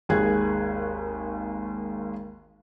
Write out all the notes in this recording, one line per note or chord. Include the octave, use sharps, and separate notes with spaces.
G#1 D#2 G#4 F#6 G#6